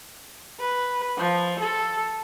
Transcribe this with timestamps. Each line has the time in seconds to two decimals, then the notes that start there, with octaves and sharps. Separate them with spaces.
0.60 B4
1.18 F3
1.60 A4